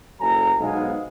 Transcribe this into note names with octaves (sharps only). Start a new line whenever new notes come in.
F#1 F#3 A4 G#5 A#5
B1 G#2 G#3 B3 F5 G#5